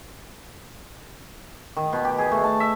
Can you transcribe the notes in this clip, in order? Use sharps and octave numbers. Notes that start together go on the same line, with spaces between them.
D#3
B2
G4
G#4
A3
A5
E5